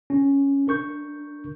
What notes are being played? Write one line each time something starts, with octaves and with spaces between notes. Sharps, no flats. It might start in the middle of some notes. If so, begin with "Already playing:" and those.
C#4
D4 A#4 C#6 G6